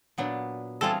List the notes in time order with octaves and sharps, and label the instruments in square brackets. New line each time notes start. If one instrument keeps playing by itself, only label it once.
[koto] A#2 F#3 B3 D4
[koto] E3 G3 C4 F4 G#4 [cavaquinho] A4